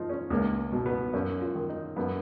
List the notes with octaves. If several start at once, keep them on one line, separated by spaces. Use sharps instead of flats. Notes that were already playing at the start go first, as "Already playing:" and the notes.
Already playing: F3 D#4 F4
C#4
C#2 A#3
B2
B3
F#2 C#4
F4
D#3
D#4
F#2 B3